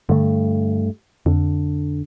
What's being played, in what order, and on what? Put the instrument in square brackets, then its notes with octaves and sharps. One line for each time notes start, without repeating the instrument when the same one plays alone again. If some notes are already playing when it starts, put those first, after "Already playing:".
[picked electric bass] G2 A3 [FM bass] D3
[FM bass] F2 [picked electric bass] D3